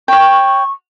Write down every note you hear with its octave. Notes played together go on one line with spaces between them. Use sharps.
C#5 G5 C#6